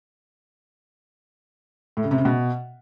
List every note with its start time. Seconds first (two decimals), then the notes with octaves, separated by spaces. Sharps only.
1.97 A2
2.04 C#3
2.11 C3
2.18 C#3
2.25 B2